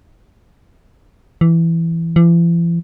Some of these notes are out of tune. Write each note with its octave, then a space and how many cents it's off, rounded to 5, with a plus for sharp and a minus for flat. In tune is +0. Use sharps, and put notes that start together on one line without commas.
E3 +10
E3 +45